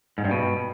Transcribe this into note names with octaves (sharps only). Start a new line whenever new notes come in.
G#2
G2
B2